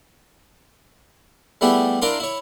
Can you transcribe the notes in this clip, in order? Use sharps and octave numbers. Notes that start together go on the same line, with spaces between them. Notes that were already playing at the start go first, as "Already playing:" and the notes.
G3 A3 B3 E4 G4 G#4
D4 E4 A#4 F5 C6 D6
E4 C#5